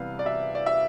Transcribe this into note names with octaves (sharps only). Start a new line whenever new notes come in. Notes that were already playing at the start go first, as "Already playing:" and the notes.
Already playing: C3 E3 G3 B3 F5
D5
E5
D5
E5